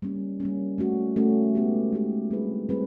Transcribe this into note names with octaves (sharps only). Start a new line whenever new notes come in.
G3 A#3 C#4
G3 A#3 C#4
A3 C#4 F#4
A3 C#4 F#4
G#3 B3 D#4 G4
G#3 B3 D#4 G4
G3 C4 E4 G#4 B4
G3 C4 E4 G#4 B4